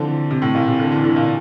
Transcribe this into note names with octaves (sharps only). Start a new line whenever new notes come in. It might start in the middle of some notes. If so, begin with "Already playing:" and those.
Already playing: D3 E3 F3 A3 C4
C3
A2
A#2
C3
D3
E3
D3
A#2